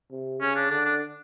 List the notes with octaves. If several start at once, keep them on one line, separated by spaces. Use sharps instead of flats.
C3
C#3 C#4
D4
D3 D4
D4